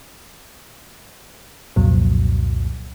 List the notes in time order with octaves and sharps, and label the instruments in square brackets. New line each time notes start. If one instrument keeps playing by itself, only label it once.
[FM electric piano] C2 F2 A#2 F#3